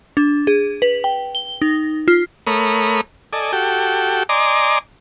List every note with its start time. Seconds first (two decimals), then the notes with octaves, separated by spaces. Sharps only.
0.17 D4
0.47 G#4
0.82 B4
1.04 G5
1.35 G7
1.62 D#4
2.08 F4
2.47 A3 A#4 C#5 B5 D#6
3.33 A4 D5 D#5 G#5
3.52 F#4 G4 A4 G5
4.29 D5 D#5 G#5 A#5 C6 D6